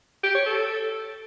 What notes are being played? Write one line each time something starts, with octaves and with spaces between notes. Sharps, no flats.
G4
C#5
A4